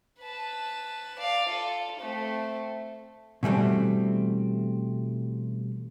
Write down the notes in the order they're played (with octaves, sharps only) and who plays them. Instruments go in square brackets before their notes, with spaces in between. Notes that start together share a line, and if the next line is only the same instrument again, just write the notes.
[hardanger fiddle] B4 A5
D5 F5
F4 A4
A3 C4
[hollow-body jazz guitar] B2 E3 G3 A3 C4